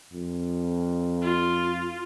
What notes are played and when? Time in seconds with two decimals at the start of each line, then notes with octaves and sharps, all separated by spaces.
0.13 F2
1.22 F4